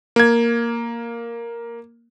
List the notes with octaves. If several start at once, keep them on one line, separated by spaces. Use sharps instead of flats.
A#3 G#6